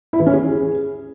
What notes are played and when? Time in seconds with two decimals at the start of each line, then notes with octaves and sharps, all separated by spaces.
0.13 E4
0.20 E3
0.26 C#4
0.33 G#4